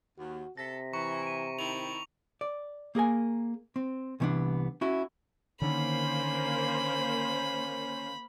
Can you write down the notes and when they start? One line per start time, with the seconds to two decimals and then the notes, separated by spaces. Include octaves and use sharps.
0.18 D#2 F#4
0.57 C3 A4 A#6 B6
0.93 E3 A#5 C#6 C#7
1.23 D7 D#7
1.59 D#3 C4 E4 F7
2.41 D5
2.95 A#3 G#4 A#4 G#5
3.76 C4
4.20 C2 E3 A3 B3 D4 F#5
4.81 C#4 E4 F#4
5.62 D3 D#3 A#3 C#4 C5 B5